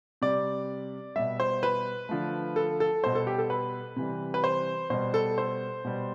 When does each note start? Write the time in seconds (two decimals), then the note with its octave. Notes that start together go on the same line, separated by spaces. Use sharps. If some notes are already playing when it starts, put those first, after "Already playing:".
0.22 C3 G3 D5
1.16 B2 G3 E5
1.40 C5
1.63 B4
2.09 D3 F3 A3
2.56 A4
2.80 A4
3.03 B2 G3 C5
3.15 A4
3.27 G4
3.38 A4
3.50 B4
3.96 C3 E3 G3
4.34 B4
4.44 C5
4.90 B2 G3 C5
5.14 A4
5.38 C5
5.85 B2 G3